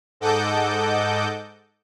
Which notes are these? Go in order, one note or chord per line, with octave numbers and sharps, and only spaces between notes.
G#2 A4 D#5 F#5 D6 G6